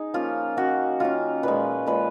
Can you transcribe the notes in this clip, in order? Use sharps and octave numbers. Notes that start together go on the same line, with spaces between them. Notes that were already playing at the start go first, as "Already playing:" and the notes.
Already playing: D#4 G#4
F3 A#3 C#4 F4
D#3 A#3 C#4 F#4
D#3 A#3 C#4 F4
A#2 F3 G#3 B4
A#2 F3 G#3 B4